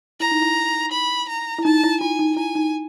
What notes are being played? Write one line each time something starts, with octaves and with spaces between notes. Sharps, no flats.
E4 A#5
D#4
E4
B5
A#5
E4
D#4 A5
E4
F4 G#5
D#4
E4 G#5
D#4